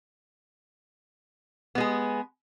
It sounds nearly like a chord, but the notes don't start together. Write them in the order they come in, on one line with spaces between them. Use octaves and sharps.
B3 G#3 G#4